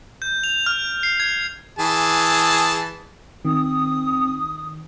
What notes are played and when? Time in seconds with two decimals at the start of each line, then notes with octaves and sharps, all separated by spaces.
0.22 G6
0.44 F7
0.66 F6
1.03 C7
1.20 G#6
1.79 E3 G#4 A5
3.45 D#3 C4 D#6